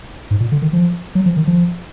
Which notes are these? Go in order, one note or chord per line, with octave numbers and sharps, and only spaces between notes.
G#2
A#2
D3
D#3
F3
F#3
F3
D#3
F3